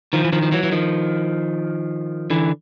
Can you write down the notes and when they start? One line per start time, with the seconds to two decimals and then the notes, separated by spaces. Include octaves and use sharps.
0.13 D#3 F3
0.24 E3
0.32 D#3 F3
0.43 F3
0.52 E3 F#3
0.63 E3
0.72 D#3 F3
2.30 D3 E3